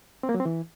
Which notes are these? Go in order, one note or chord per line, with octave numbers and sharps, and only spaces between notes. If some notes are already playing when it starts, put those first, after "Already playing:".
C4
A#3
F#3
C4
E3